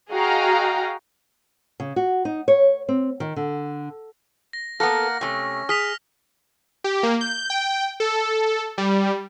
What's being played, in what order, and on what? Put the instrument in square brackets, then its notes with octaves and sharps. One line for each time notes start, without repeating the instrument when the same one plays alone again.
[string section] F#4 G#4 D#5 F5 G5 A#5
[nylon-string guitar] C#3
F#4
D#4
C#5
C4
D#3
D3
[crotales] A#6
[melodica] A#3 A#4 F#5 [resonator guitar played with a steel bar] B3 A4 [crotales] A#6
[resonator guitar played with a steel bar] C3 A3 [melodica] C#4
[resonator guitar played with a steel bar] G#4 [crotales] F6 B6 F7
[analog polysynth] G4
A#3
G6
G5
A4
G3